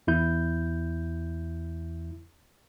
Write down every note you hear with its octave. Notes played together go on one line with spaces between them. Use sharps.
E2 E4 G6